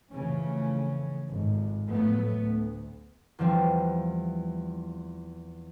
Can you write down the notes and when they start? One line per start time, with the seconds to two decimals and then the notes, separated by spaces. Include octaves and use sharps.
0.11 F2 C#3 E3 A3 C#4
1.28 G#1 F2
1.86 F2 A2 F#3 A3 B3
2.40 D2
3.39 E2 E3 F3 G3 C4